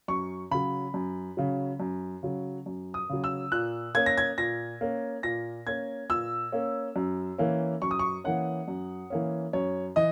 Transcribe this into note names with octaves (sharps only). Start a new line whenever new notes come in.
F#2 C#6
C#3 F#3 B5
F#2
C#3 F#3
F#2
C#3 F#3
F#2
D#6
C#3 F#3
E6
A#2 F#6
A#3 C#4 G#6
A#6
G#6
A#2 A#6
A#3 C#4
A#2 A#6
A#3 C#4 G#6
A#2 E6
A#3 C#4
F#2
E3 A#3 C#4
F#2 C#6
D#6
C#6
E3 A#3 C#4 F#5
F#2
E3 A#3 C#4
F#2 C#5
E3 D#5